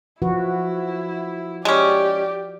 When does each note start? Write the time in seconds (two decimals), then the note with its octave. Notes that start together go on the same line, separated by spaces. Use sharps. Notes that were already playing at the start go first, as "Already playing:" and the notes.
0.22 F3 E4 F#4 B4
1.65 G#3 C#4 G4 D5